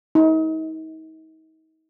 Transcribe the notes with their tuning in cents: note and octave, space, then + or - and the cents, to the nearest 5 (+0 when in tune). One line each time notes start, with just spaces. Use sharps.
D#4 +35